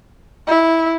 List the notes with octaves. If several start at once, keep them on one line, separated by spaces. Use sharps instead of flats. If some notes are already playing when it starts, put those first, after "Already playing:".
E4